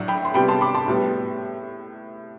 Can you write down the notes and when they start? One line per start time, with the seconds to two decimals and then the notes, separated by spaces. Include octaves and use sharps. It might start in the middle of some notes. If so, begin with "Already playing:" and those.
Already playing: A2 F#3 A3 D4 F#5
0.08 G5 B5
0.25 C6
0.34 C3 G3 B3 G5 B5
0.48 A5 C6
0.61 B5 D6
0.75 A5 C6
0.88 A2 G3 B3